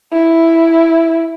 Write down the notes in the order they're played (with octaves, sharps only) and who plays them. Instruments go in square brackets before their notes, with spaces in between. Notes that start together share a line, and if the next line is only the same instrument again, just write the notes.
[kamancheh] E4